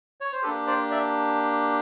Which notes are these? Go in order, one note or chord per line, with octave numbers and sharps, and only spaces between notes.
C#5
C5
A#3 D4 G4 A4 B4
C5 D5
D5 E5